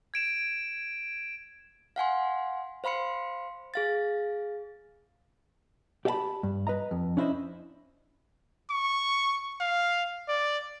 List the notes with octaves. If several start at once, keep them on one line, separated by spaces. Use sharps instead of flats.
G#6 D7 E7
F5 F#5 G#5 C6
C5 F5 B5 C6 C#7
G#4 F5 A6
G4 D5 E5 F5 A5 B5
G2
B4 D#5 A#5
F2
C#4 D4 E4 C5 D5 D#5
C#6
F5
D5